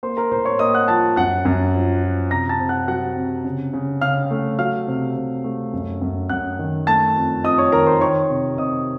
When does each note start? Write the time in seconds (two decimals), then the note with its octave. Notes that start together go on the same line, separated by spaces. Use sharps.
0.03 A#3 C5 C6
0.17 A#4 A#5
0.31 A2 C5 C6
0.45 C#5 C#6
0.59 A#3 D#5 D#6
0.74 F#5 F#6
0.88 F3 A5 A6
1.16 F#2 F#5 F#6
1.45 F#2
1.74 F3
2.02 F3
2.31 C3 A#5 A#6
2.49 A5 A6
2.60 C3
2.69 F#5 F#6
2.88 F#3 F#5 F#6
3.16 C3
3.44 C#3
3.74 C#3
4.01 C#3 F5 F6
4.31 A3
4.59 F#3 F5 F6
4.87 C3
5.16 C3
5.44 A3
5.73 F#2
6.01 F#2
6.29 F#2 F#5 F#6
6.59 D#3
6.87 A3 A5 A6
7.15 F2
7.44 F2 D#5 D#6
7.58 C#5 C#6
7.72 D#3 A#4 A#5
7.87 C5 C6
8.01 D#3 C#5 C#6
8.30 C3
8.58 C3 D#5 D#6